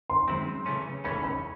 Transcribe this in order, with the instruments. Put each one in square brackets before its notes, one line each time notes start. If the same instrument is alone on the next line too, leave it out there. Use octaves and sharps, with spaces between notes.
[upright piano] C6
[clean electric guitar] F#2 D#3 G#3 C4 E4
C#3 E3 A3 C#4
[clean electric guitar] C#3 E3 A3 C#4 [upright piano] B5
[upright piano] B5